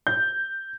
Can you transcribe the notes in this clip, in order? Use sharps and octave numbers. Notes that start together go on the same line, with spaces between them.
G6